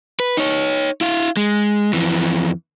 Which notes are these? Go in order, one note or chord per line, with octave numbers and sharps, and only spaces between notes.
B4
D#4 C#5
E4 F5
G#3
F2 E3